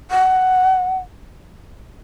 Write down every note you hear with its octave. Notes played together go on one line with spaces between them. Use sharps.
F#5